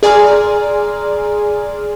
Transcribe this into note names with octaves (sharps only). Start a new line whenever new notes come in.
G#4 D5 G#5 A#5 C6 F6